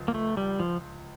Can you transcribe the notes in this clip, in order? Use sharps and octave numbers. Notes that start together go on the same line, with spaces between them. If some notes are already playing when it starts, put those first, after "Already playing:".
Already playing: C#2 F3
A#3
A3
G3
F3